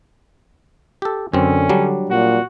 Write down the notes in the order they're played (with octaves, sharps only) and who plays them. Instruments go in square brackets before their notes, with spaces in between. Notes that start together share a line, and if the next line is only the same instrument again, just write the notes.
[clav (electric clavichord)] G4 A4
[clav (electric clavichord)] F#2 C4 [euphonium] D3 [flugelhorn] C#4
[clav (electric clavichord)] F#3 G3 D4
[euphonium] A#2 [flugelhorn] F#4